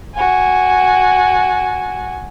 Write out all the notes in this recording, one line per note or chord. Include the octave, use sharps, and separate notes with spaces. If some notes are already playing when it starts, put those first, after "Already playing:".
F#4 G#5